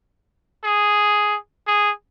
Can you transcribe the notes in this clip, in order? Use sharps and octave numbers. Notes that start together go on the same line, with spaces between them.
G#4
G#4